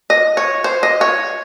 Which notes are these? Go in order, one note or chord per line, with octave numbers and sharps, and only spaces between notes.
D#5
C#5
C5
D#5
C#5